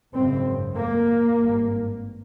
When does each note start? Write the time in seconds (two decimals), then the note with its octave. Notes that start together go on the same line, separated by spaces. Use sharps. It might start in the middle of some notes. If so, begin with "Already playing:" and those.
0.13 G#1 F#2 C#3 C4
0.75 A#3
1.35 G#1 G2